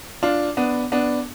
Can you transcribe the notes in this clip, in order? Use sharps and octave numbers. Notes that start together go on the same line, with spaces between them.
D4 F4
B3 D4
B3 D4